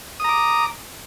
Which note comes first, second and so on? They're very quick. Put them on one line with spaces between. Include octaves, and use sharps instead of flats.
D#6 A#5 D6